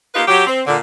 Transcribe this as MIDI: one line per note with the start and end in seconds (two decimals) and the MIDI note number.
0.15 0.23 58
0.15 0.23 63
0.15 0.23 65
0.15 0.23 67
0.15 0.23 71
0.28 0.46 54
0.28 0.46 67
0.47 0.60 60
0.66 0.76 46
0.66 0.76 50